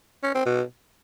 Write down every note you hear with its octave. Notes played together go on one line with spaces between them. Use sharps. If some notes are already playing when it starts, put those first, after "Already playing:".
C#4
C4
B2